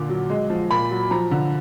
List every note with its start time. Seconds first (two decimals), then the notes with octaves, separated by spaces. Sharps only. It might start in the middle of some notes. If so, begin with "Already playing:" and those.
Already playing: A#2 D3 D6
0.09 F#3
0.30 G#3
0.50 F3
0.71 A#2 B5
0.91 F#3
1.11 F3 A#5
1.31 D3